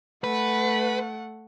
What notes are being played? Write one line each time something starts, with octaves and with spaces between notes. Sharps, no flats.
A3 B4 F#5